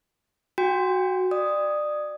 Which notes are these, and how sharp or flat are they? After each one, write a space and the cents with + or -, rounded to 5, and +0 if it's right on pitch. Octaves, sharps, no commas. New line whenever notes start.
F#4 +0 G5 +35
D5 +25 D#6 +0